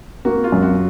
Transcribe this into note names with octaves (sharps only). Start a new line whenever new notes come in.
A#3 F#4
F4
F#2
F#4